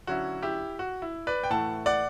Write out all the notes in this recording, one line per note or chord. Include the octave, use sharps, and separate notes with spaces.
D3 F#3 C#4 E4 F#4
E4 G4
F#4
E4
B4 D5
G5
A2 E3 A3 F#5 A5
D5 F#5